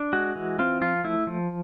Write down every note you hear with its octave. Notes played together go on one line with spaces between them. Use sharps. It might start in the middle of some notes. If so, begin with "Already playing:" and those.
Already playing: D4
G#3 F#4
E3
C4 F4
F3 F4
A3 E4
F3